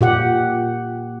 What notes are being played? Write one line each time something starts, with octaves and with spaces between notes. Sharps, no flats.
A#2 G4 F#5